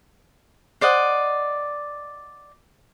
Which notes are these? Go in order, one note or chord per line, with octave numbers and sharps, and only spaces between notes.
C5 D5 D#5 F#5